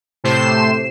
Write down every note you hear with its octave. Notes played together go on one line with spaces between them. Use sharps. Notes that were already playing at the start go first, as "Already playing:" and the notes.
A2 C3 A3 C5 C7 E7